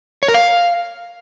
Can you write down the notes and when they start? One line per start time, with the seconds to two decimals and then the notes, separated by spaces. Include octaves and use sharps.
0.23 C#5
0.28 A#4
0.34 F5